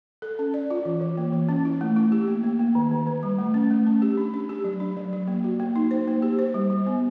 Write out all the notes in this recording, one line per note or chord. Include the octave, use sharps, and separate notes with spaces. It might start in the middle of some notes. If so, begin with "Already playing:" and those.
A4
C#4
D5
F4
E3
E3
A#3
E3
C#4
E4
A3
E4
G4
A#3
A#3
A#3
D#3
D#3
D#3
G3
A3
C#4
A3
C#4
G4
D4
D4
G4
F#3
D4
F#3
F#3
A#3
F#4
A#3
D#4
C5
A#3
G4
C5
G3
G3
B3